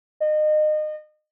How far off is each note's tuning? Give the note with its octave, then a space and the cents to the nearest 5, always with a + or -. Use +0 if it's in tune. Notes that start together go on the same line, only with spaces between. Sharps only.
D#5 -30